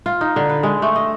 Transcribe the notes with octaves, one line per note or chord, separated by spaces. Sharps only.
F4
D#4
D3
B4
G#3
A3
D#5